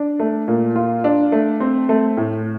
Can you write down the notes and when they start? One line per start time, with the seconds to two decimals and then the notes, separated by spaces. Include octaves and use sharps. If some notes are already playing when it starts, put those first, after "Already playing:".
Already playing: D4
0.20 A3
0.48 A#2
0.76 F4
1.04 D4
1.32 A3
1.60 C4
1.89 A3
2.17 A2